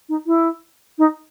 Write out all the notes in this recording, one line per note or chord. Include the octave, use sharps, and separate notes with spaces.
D#4
E4
D#4